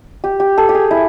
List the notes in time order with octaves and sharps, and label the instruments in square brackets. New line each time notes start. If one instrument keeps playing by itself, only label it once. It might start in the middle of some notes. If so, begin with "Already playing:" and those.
[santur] G4
G4
A4
G4
G#4
E4